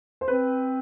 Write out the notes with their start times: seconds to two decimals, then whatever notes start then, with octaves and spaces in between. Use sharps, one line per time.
0.21 C5
0.28 C4 B4